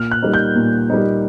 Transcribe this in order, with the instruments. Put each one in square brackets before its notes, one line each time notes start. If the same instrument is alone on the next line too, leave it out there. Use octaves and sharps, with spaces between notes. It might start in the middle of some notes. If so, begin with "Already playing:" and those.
Already playing: [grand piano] A#2 F6
F#6
G3 A#3 D#4
G6
A#2
G3 A#3 D#4